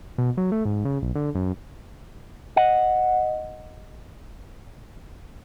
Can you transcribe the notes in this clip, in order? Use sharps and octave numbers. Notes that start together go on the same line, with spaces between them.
B2
F#3
A3
G#2
C#3
B1
D3
F#2
D#5 F#5